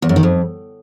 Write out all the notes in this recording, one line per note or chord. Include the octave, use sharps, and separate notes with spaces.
E2
F#2
D#3
F2